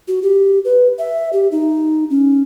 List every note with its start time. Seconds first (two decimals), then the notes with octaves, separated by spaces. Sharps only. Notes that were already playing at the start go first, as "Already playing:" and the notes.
0.08 F#4
0.22 G4
0.65 B4
0.99 E5
1.33 G4
1.52 D#4
2.10 C#4